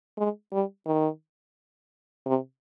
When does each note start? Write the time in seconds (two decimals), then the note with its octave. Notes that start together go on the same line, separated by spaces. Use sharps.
0.18 G#3
0.52 G3
0.87 D#3
2.26 C3